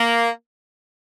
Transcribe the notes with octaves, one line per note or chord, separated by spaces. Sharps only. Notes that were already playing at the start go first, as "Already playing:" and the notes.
Already playing: A#3